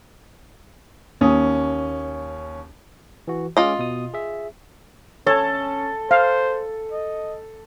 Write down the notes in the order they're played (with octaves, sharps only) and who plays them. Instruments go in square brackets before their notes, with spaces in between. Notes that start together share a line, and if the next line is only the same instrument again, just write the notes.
[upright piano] D#2 C#4 D#6
[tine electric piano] E3 F#4
[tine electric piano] G#3 C#4 D6 [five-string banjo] F4 D#5
[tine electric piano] B2 D#6
G#4 E5
[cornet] C#4 [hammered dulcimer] A4 [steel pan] C#5
[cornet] C5 [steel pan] F5
[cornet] D#5